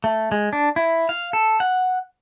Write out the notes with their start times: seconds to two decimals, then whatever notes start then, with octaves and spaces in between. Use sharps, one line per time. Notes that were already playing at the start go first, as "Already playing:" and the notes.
0.04 A3
0.32 G#3
0.53 D4
0.76 E4
1.09 F5
1.33 A4
1.60 F#5